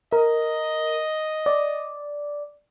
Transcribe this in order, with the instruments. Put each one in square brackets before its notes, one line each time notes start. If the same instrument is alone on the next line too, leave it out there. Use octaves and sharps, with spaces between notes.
[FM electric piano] A#4 [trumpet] D#5
[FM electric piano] D5